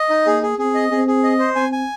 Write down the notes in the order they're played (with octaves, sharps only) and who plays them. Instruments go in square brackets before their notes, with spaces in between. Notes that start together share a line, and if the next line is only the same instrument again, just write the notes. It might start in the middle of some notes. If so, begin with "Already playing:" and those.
Already playing: [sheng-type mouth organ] D#5
D#4
[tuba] A#3 [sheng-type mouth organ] G#4
[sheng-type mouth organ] G#4
[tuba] C4 [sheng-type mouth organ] G#4
[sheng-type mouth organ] D#5
[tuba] C4 [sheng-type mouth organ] G#4
[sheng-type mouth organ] G#4
D#5
C5
[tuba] C4 [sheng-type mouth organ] G#5
[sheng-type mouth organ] G#5